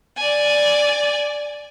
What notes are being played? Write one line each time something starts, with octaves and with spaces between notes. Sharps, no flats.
D5 G#5